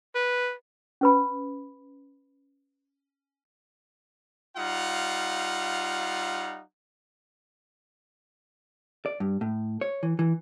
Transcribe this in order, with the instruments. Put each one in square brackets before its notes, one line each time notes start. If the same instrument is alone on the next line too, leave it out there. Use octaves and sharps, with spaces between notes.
[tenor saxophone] B4
[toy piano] C#4 B4 B5
[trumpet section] G3 D#4 F4 F5 F#5
[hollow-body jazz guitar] D5
G2
A2
C#5
E3
E3